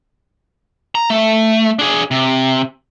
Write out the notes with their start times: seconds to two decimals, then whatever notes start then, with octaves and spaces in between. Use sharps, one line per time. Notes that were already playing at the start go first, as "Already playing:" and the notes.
0.95 A#5
1.10 A3
1.79 D4 G#4
2.11 C3